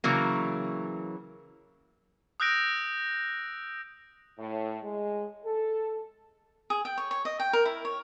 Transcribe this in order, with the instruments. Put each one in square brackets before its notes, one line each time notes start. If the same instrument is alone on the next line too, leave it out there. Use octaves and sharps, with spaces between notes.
[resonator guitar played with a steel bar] C#3 E3 F#3 A#3
[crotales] D#6 E6 F#6 G6 A#6 D7
[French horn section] A2
G#3
A4
[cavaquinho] G#4
G5
C#5
C#5
D#5
G5
A#4
E4
C#5